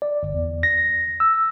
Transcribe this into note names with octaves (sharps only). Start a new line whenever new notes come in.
D5
G1
E2
A#6
E6